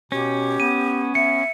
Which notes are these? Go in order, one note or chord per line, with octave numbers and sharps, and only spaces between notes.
B2 C#4 G4
B3 D#7
B3 E5 C#7